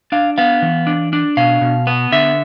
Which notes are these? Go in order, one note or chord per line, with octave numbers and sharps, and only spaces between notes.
D4 F5
B3 F5
E3
D4
D4
B2 F5
B2
B3
D3 E5